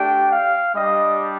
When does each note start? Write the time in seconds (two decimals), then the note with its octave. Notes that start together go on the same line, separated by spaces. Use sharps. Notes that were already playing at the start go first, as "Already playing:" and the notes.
Already playing: A3 D4 G4 G5
0.29 F5
0.73 G3 D4 G4 D#5